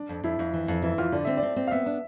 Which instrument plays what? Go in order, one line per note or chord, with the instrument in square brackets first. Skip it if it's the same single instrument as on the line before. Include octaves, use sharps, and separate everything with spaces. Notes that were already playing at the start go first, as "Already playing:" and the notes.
Already playing: [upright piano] D4
[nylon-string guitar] F2
[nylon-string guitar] F2 [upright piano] E4
[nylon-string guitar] F2
E3
F2
[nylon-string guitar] E3 [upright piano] E4
[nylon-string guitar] F2 [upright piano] F4
[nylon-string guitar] D3 [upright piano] D5
[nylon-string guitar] C4 [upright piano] E5
[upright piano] D5
[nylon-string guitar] C4
C4
[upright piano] F5
[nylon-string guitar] B3 [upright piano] E5
[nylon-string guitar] D4